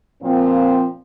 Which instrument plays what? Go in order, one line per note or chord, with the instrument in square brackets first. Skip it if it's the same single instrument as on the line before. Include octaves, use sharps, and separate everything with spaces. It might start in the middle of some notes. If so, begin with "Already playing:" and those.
[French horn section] A#2 F3 A#3 C4